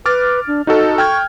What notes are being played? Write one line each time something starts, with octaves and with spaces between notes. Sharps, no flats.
B4 D6 F6 A6
D4
D#4 F#4 A4 D#5
G5 C#6 F6 G#6